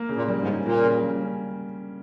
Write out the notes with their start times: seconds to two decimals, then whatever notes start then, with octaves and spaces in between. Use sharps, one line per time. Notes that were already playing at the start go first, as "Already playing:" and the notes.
Already playing: A#3
0.09 C#3
0.16 A#2
0.28 G3
0.41 G#2
0.47 C#4
0.65 A#2 A#3
0.84 C#3
1.02 G3
1.21 C#4